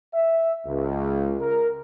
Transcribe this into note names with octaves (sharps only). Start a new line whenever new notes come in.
E5
C#2
A#4